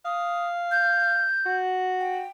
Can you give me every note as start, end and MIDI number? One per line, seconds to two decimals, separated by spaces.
0.05 1.23 77
0.05 0.47 87
0.71 1.57 91
1.45 2.23 66
2.00 2.29 79